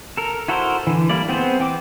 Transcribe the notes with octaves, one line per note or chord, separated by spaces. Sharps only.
A4 A#4
E4 F#4 A4 A#4 C5
D3 E3
G3 A#3 E4 D5
B3 C4 G#4 C5
E3 G5 D6